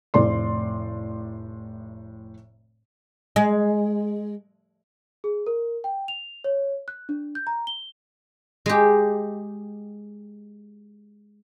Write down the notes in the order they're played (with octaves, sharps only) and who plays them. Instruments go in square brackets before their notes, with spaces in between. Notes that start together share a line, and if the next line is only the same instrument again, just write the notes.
[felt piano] F1 A2 D5 C6
[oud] G#3
[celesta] G#4
A#4
G5
F7
C#5
F#6
D4
G6
A#5
G7
[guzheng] G#3 G4